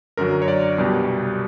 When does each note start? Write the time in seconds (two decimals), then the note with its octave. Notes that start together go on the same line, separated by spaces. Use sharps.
0.17 F#2 D3 F#3 A#4
0.42 C#5
0.48 D5
0.78 C2 B2 G3